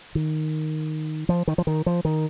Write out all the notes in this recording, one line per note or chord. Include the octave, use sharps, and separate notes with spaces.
D#3
F3
D#3
F3
D#3
F3
D#3